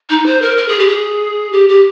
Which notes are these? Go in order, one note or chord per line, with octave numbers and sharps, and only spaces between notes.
D#4
C5
A#4
A#4
G#4
G4
G#4
G4
G4